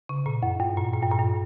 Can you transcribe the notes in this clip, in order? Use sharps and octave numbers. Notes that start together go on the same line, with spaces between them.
C#3
A#2
F#2
G2
A#2
A#2
G2
A#2
G2